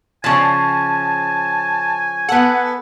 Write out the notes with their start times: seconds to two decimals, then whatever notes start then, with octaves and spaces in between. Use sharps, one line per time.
0.24 C#3 F3 G#5 A5
2.29 B3 A4 F#5